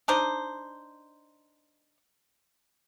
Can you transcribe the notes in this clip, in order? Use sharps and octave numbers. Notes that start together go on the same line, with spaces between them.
D4 D#4 C5